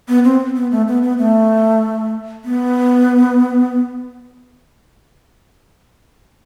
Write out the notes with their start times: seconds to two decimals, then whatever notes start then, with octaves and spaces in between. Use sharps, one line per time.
0.08 B3
0.24 C4
0.56 B3
0.71 A3
0.88 B3
1.03 B3
1.18 A3
2.44 B3